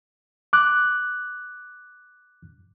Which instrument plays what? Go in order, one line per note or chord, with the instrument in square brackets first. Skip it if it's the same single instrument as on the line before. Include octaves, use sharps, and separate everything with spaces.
[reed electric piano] D6 F#6